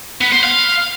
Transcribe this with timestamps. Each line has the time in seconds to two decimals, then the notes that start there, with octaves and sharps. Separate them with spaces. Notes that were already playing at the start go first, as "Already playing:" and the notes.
0.21 B3
0.32 C5
0.43 F5